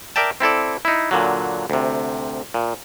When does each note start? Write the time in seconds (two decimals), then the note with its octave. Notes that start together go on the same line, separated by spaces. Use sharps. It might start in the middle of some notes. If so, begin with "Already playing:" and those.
0.16 A#4 D5 E5 G5 A5
0.40 C4 E4 A4 D5
0.85 D#4 E4
1.11 A#2 D3 F#3
1.70 D2 C3
2.54 A#2